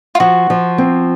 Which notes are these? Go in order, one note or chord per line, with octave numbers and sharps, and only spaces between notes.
F4
F3 F#4
F3
C4